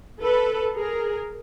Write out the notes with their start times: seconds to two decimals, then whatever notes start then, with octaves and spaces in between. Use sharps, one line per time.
0.21 A4 B4
0.75 G#4 A#4